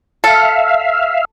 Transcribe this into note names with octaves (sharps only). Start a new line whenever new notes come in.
A4 E5 F5